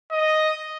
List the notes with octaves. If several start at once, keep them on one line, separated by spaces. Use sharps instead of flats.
D#5